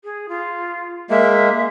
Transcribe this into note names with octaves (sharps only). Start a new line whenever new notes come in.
G#4
F4
G#3 A#3 E5